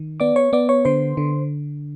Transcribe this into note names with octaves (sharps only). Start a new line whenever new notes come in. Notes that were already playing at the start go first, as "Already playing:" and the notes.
Already playing: D#3
B3 D5 D6
C#5 C#6
B3 D5 D6
C#5 C#6
D3 C5 C6
D3